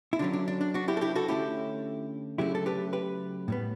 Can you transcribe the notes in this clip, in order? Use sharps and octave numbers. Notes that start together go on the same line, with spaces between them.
E4
D3 F#3 C#4 D4
D4
D4
D4
D4 F#4
E4 G4
A4
E4 G4
F#4 A4
D3 A3 C#4 E4 G4
C#3 F#3 A3 C#4 E4 G4
A4
G4 B4
G4 B4
A2 G3 B3